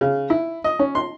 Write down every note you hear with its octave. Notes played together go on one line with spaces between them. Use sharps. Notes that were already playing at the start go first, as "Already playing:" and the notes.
C#3
E4
D#5
C#4
C6